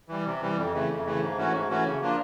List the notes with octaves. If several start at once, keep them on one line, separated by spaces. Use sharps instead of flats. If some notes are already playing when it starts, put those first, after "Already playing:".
E3 G3
C3
E3 G3
F2
C#3 E3 A3
F2
C#3 E3 A3
G#2
E3 A3 C#4 F#4
G#2
E3 A3 C#4 F#4
C#3
F3 A#3 D4 F4